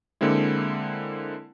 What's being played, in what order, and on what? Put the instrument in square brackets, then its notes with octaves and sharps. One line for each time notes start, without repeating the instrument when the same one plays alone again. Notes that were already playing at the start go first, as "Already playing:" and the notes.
[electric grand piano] D3 G#3 A#3 C4 E4